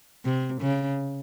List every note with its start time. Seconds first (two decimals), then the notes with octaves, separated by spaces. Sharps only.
0.25 C3
0.61 C#3